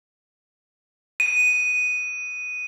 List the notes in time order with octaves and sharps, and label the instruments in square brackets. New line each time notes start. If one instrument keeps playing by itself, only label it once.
[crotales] D#7